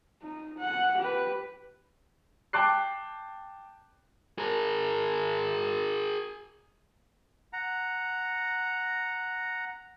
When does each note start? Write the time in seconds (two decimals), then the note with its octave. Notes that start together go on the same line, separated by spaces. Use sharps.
0.22 D#4
0.58 F#5
0.98 G4 B4
2.53 G5 A5 D6 F#6 C7
4.38 G#4 A#4
7.53 F#5 A#5